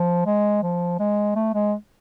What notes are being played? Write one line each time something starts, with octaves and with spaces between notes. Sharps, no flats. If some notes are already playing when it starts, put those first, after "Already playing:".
Already playing: F3
G#3
F3
G#3
A3
G#3